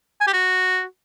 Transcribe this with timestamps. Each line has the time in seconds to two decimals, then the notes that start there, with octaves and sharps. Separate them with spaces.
0.21 G#5
0.27 G4
0.33 F#4